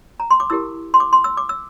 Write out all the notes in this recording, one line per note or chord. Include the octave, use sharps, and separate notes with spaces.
A#5
C6
D6
E4 G4 A#4 E6
C6
D6
C6
E6
D6
E6